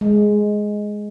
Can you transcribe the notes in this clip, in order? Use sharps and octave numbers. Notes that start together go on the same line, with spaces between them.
G#3